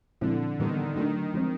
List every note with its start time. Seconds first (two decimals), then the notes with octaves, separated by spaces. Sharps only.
0.21 A#2 D3 F3 G#3 C4 E4
0.59 A2 D#3 E3 G3 B3
0.96 D3 D#3 F#3 A3 D4
1.34 F3 G#3 C4